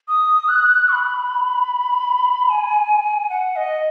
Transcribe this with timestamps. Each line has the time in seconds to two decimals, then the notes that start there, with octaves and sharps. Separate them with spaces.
0.08 D#6
0.48 F#6
0.88 C#6
0.93 B5
2.49 G#5
3.29 F#5
3.56 D#5